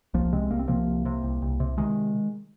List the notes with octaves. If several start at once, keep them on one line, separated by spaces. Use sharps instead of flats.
C2 F3 A#3
C3 G#3 C4
C2 A#3
C4
C3 F3 A#3
C2
C3
C2
C2
C3
C3 D#3 G#3